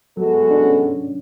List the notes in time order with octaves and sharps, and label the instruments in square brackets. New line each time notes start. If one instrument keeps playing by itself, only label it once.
[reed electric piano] F#3 [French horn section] G#3 B3 F#4 A4
[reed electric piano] D4
C#4